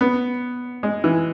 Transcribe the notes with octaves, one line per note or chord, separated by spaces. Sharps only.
B3
G#3
E3